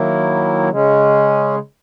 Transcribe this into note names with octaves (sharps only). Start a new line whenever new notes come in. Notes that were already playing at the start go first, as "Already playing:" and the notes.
Already playing: D#3 F#3 A#3 E4
C#3 G#3 C#4